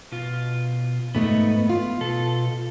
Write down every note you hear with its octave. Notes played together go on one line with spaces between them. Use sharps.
B2 F4
G#2 A3 B3 D#5
F4
B2 A4